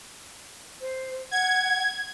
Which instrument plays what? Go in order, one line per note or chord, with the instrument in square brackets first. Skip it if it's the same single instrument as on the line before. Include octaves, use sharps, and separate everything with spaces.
[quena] C5
[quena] F#5 [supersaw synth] G#6